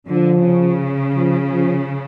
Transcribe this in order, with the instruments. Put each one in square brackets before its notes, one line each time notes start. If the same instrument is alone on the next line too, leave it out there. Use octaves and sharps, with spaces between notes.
[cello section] D3 [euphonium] F3
[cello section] C#3
[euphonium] F3
F3